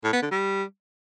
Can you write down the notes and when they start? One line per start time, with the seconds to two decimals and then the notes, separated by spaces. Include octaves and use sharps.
0.04 A2
0.13 B3
0.22 D3
0.31 G3